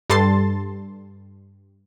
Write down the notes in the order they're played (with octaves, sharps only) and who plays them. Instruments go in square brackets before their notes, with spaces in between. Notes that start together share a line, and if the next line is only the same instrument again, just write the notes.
[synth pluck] G2 G3 A4 A5 C6 A6